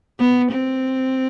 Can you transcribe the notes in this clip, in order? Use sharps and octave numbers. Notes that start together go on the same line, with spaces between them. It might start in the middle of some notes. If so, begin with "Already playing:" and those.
B3
C4